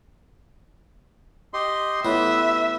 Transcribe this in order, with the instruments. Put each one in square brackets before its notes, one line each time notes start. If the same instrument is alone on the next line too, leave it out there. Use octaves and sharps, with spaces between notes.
[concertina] G4 D#5 C6
[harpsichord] A1 A2 B3 [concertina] B4 [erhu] E5